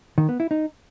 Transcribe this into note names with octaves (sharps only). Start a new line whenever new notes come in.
D#3
B3
E4
D#4